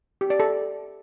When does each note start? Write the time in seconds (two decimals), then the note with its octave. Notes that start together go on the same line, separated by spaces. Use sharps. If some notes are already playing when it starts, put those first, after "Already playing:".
0.21 G4
0.30 D5
0.40 A4